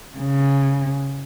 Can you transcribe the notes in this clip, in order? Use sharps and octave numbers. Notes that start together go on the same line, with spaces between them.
C#3